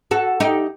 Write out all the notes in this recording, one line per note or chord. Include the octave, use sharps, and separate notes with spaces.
F#4 A4
D#4 G4